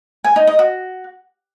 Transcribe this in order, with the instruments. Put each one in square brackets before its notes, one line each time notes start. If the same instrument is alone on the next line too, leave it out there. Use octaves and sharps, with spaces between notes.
[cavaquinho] G#5
D#4
D#5
F#4